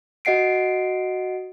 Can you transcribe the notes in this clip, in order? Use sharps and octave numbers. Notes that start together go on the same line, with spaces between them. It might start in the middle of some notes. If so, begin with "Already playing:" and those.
F#4 D#5 F#5 C7 D7